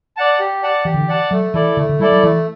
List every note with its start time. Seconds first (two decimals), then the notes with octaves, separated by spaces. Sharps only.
0.17 D5 F#5 A5
0.40 G4
0.63 D5 F#5 A5
0.85 E3 G4
0.94 D3
1.01 E3
1.08 D5 F#5 A5
1.31 F#3 A3
1.54 E3 E4 A4 D5
1.77 D3 A3
1.89 D3
2.00 G3 E4 A4 D5
2.12 F#3
2.23 E3 A3